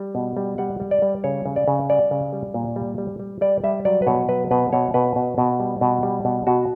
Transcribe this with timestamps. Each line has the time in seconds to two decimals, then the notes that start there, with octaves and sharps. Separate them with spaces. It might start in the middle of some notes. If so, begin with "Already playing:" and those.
Already playing: G3
0.15 B2
0.37 G3
0.58 G3 F#5
0.80 G3
0.91 D5
1.02 G3
1.24 C#3 C#5
1.46 C#3
1.56 D5
1.68 C#3
1.89 G3 D5
2.11 C#3
2.33 G3
2.54 A#2
2.76 G3
2.98 G3
3.20 G3
3.41 G3 D5
3.64 G3 E5
3.85 F#3 D5
4.02 B4
4.07 B2 C#5
4.29 F#3 B4
4.51 B2 B4
4.73 B2 C#5
4.94 B2 B4
5.16 B2
5.38 B2
5.60 G3
5.81 B2
6.03 G3
6.25 B2
6.47 B2 F#4